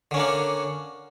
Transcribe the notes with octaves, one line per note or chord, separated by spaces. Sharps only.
D3 A#3 C#4 D4